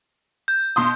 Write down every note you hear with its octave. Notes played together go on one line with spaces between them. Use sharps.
G6
B2 C6 D#6